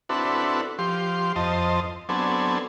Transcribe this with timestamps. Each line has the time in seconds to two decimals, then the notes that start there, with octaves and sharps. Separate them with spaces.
0.09 C4 D4 E4 F#4 A4 B4
0.79 F3 G4 C6
1.36 F2 C5 D#5 A5
2.09 F#3 B3 C4 D4 A4 G#5